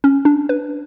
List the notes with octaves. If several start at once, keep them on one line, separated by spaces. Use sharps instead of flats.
C#4
D4
B4